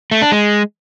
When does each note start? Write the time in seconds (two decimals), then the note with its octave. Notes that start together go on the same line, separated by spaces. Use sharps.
0.11 A3
0.22 D4
0.32 G#3